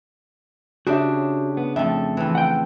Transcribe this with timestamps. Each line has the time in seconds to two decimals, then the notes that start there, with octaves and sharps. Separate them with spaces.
0.87 C#3 D4 F#4 G4 E5
1.57 B3
1.76 F2 A3 E5
2.17 F2 E3
2.35 F#5 G5